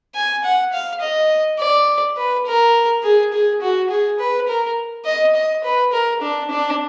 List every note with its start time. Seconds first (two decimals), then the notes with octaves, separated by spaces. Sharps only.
0.15 G#5
0.44 F#5
0.73 F5
1.01 D#5
1.59 D5
2.17 B4
2.47 A#4
3.03 G#4
3.33 G#4
3.62 F#4
3.90 G#4
4.20 B4
4.48 A#4
5.06 D#5
5.35 D#5
5.64 B4
5.93 A#4
6.22 D4
6.51 D4